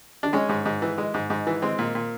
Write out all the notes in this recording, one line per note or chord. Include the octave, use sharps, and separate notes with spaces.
D4
G#3 C#4
G#2
G#2
E3
G#3
G#2
G#2
E3
G#3 C4
A#2
A#2